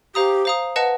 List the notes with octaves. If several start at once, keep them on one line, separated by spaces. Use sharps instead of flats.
G4 C5 F5 A#5 D#6
C5 F5 A#5 D#6
B4 D#5 F#5 A5